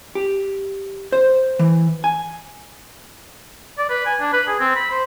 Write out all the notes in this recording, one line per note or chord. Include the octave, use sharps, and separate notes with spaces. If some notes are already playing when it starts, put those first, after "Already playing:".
G4
C5
E3
G#5
D5
B4
G#5
D4
B4
G#4
C4
B5
C5